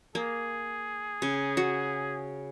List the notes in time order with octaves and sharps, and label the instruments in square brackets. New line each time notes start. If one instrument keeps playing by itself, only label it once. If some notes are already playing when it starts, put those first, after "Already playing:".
[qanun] A#3 [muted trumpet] G#4
[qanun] C#3
F#4